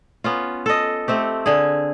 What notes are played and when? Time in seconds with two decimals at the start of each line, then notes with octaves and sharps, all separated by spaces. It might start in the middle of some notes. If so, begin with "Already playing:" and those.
0.24 B3 C#4 F4
0.66 A4 D#5
1.08 A3 C4 G4
1.46 D3 G#4